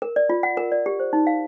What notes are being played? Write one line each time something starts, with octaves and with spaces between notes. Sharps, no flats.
A#4
D5
F4
F#5
A#4
D5
G4
C5
D#4
F5